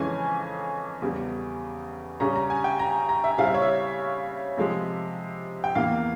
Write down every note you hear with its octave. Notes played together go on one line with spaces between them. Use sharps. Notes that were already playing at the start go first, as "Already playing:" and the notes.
Already playing: F2 C#3 E3 G#3 C#4 G#5
E2 C#3 G3
C#3 G3 C#4 A#5
A#5
G#5
G5
A#5
A#5
E5
C#3 G3 C4 E4 F5
E5
C#5
E5
C3 F3 G#3
G5
E2 E3 A#3 F5